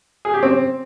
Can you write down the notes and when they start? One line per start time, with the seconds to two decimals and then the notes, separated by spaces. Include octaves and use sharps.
0.25 G#4
0.34 G4
0.43 C4